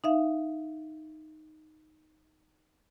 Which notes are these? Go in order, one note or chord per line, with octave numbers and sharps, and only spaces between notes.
D#4 E5 F5